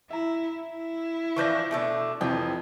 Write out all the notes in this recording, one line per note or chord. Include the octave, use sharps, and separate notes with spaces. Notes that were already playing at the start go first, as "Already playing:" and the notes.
E4 E5 A#5
E4
E3 F3 D4 C#6 G6 A#6
B2 A3 D4 E5 E6
F2 C3 E3 F3 G5